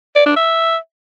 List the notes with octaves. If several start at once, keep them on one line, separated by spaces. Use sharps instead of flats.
D5
D4
E5